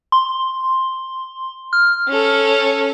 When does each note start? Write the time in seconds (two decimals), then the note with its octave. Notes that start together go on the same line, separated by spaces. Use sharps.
0.12 C6
1.73 F6
2.08 C#4 A4